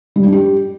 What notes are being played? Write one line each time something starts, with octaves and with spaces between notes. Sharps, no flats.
G3
D4
G4